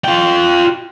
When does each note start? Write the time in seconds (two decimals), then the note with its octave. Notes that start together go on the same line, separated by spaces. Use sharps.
0.04 F4 G5